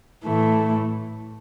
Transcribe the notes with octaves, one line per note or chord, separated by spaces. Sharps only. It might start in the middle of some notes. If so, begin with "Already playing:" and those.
A2 E3 A3